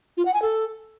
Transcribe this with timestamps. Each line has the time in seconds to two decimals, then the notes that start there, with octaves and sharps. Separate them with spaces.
0.17 F4
0.25 F#5
0.34 G#5
0.42 A4